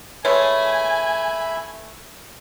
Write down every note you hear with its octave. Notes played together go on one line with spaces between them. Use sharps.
E3 G#3 A3 C#5 E5 G#5 B5